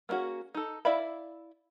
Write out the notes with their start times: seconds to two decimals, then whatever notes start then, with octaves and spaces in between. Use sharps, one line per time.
0.09 A#3 B3 C#4 F#4 G#4
0.55 D#4 A4
0.85 E4 D5 E5 F5 B5